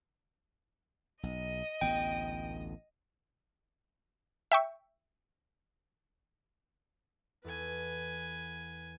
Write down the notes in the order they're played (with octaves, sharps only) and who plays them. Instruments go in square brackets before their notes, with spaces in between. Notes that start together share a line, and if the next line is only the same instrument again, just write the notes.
[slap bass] B1 [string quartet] D#5
[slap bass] A1 D2 B3 [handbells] G5
[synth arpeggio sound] E5 G5 C#6
[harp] E2 A4 [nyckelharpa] B4 G#5